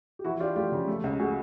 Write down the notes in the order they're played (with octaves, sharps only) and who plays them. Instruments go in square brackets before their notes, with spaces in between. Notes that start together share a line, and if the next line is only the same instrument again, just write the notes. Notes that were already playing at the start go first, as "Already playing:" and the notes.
[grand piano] G4
[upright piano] E3 [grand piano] E4 F#4
[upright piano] D4 [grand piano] F4 G4
[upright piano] A3 [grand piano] F4 G4
[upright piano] C#3
A3
C#2
[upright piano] A3 [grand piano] F#4 G#4